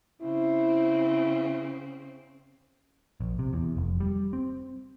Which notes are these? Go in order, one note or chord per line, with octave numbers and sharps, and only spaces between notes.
C#3 C4 E4
A#1
C3
E2
F1
G3
C4